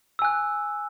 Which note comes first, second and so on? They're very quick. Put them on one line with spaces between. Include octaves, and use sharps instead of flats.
E6 G#5 F#6